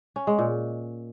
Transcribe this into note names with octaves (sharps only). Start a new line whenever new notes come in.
C#4
G#3
A#2